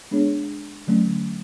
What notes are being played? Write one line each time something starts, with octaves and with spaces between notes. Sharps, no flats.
G#3 B3 D4 G#4 C#5
D3 F#3 A3 C#4